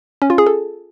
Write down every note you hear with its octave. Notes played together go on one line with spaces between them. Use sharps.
C#4
F4
G#4
A4